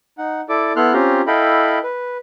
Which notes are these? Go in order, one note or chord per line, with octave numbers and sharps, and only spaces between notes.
D#4 F#5
E4 A4 D5 D6
B3 E4 A4 C6 F6 F#6
C4 C#4 F4 G4 A#5 C6
E4 A4 D#5 F5 G5 B5
B4